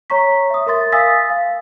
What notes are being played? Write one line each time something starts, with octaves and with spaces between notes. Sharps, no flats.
C#5 A#5 C#6 B6
E5 D#6
A#4 E5 C6 A6
F5 G#5 D#6 E6 A6 B6
F5